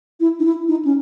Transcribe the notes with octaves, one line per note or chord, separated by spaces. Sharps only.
E4
D#4
E4
D#4
C#4